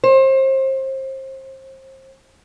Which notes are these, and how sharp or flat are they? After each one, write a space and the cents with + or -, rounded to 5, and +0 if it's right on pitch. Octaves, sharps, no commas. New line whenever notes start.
C5 +30